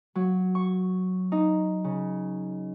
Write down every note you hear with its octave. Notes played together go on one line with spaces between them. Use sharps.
F#3
C#6
D#4
C#3